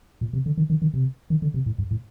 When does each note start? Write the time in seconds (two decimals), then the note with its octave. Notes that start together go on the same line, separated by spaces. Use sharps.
0.21 A#2
0.33 C3
0.46 D3
0.57 D#3
0.70 D#3
0.82 D#3
0.94 C3
1.30 D#3
1.42 D3
1.54 C3
1.66 A2
1.78 G2
1.91 A2